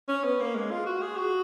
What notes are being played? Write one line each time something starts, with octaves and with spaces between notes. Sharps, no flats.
C#4
B3
A#3
G#3
F4
F#4
G#4
F#4